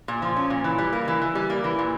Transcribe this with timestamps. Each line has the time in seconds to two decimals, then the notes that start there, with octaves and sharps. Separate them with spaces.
0.08 A#2
0.22 F3
0.36 C#4
0.50 A#2
0.64 E3
0.78 G3
0.93 A#3
1.08 E3
1.22 E3
1.35 G3
1.50 A#3
1.64 E3
1.79 A#2